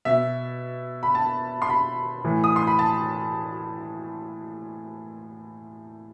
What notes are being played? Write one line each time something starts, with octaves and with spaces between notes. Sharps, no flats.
B2 E5
B5
A5
C6
B5
A2 E3
D#6
C6
B5
A5